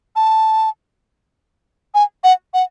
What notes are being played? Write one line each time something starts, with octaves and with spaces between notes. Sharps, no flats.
A5
G#5
F#5
F#5